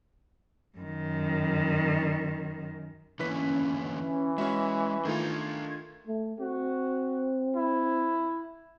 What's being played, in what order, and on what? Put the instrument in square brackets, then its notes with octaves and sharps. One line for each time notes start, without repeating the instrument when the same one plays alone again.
[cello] F#2 D#3
[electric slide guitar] D3 E3 A#3 [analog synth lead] C#4 [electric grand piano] E4 B4 B6
[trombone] E3
[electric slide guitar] G#3 [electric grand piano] C#4 F#4 E5
[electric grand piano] D#3 A3 F4 [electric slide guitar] D4 A#5 [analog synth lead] G#6
[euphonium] A3
[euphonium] C4 [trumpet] F#4
[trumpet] E4